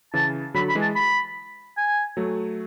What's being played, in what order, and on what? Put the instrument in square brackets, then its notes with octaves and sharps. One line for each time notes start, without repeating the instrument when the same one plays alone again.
[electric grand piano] C#3 E3 [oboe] A5
[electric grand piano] D3 F#3 [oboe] B5
[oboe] B5
[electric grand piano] E3 G#3
[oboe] A5
B5
G#5
[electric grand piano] F#3 A3